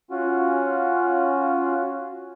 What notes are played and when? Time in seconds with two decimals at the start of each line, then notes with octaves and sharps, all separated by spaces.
0.11 C#4 F4 F#4